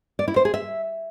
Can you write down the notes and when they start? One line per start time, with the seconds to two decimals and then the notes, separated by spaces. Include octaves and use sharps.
0.19 D5
0.28 E4
0.36 C5
0.45 G#4
0.54 E5